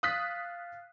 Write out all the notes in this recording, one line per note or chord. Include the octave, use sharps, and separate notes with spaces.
F5 D#6 F6 F#6 A6 B6